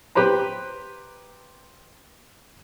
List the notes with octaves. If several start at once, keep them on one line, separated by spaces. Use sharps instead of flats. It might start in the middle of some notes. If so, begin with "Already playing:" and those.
G4 B4 C5 A#5